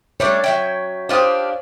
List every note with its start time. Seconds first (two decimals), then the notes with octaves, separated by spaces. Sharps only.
0.20 G3 A3 D4 C#5
0.44 F#3 E5 G5
1.09 D4 F4 G4 C5 D#6